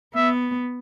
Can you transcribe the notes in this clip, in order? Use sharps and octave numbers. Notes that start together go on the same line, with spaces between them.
B3 E5